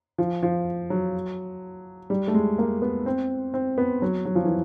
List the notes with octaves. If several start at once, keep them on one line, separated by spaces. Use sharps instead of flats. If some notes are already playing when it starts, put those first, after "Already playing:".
F3
F3
F#3
G3
A3
G#3
A#3
B3
C4
C4
B3
F#3
F#3
F3
E3